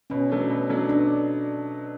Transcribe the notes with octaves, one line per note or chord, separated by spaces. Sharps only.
B2 C#4
F#3 A3 D4
B2
F#3 A3 D4
B2 D4